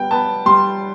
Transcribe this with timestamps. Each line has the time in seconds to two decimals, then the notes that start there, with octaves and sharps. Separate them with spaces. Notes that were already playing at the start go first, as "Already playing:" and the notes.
Already playing: G3 B3 G5
0.11 B3 A5
0.46 G3 C6